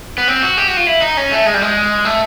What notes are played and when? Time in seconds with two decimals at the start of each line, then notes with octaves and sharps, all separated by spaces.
0.18 B3
0.28 C4
0.43 F#4
0.57 G4
0.68 F#4
0.77 F4
0.87 E4
1.02 D#4
1.17 C#4
1.32 A3
1.46 G#3
1.54 G3
1.61 G#3
2.05 A3